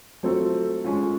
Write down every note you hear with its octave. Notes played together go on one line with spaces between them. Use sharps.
F#3 A3 C4 F4 A4
G#3 C#4 F4